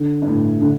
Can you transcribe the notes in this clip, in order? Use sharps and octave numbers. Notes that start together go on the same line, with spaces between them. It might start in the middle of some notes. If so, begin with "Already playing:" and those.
Already playing: D3
G2
A2
D3